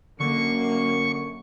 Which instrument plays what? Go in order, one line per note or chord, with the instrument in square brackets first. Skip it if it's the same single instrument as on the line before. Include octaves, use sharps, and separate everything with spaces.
[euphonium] F#2 [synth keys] D3 [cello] A#3 [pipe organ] C#6